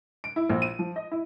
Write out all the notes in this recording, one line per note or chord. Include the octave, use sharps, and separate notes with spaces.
D7
E4
A#1
D#7
F3
D#5
E4